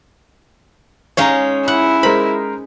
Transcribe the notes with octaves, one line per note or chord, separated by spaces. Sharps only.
G#3 C#4 D#4 C#5 F5 A#5
E4 F#5
G#3 A#4 C5 B5